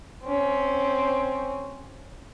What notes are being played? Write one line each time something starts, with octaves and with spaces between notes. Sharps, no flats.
C4 C#4